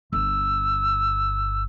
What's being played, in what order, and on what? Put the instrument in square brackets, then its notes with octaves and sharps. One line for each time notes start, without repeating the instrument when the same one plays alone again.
[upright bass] G1 [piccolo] E6